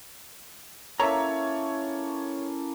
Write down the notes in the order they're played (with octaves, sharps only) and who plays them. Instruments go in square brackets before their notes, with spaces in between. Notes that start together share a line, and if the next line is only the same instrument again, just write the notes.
[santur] A#3 A4 [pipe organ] C#4 E4 [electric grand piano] C#5 [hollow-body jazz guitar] E5 A#5